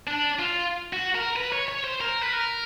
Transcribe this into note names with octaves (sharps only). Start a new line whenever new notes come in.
D4
F4
F#4
A#4
B4
C#5
C#5
C5
A#4
B4
A#4